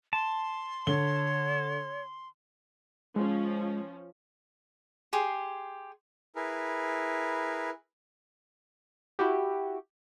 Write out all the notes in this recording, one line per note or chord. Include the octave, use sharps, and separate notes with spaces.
A5 C6
D3 C#5 G7
F3 G#3 C#4
G4 G#4 C6
E4 G#4 A#4 B4
E4 F#4 G4